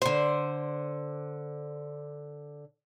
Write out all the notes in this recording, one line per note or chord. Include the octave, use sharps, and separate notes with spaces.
D3 C5